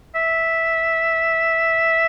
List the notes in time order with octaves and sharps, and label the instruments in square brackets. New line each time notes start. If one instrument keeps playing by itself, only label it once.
[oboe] E5